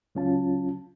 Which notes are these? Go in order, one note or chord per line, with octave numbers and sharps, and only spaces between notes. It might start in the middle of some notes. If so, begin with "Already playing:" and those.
C#2 F#3 C#4 F4 A5